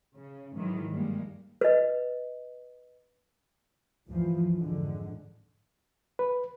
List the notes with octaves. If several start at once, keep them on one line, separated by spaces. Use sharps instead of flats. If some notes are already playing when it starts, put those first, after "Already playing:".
C#3
G#2 D#3 E3 F#3
G2 G3 G#3 A#3
B4 D#5
D2 G2 E3 F3
F2 G#2 D3 G#3
B4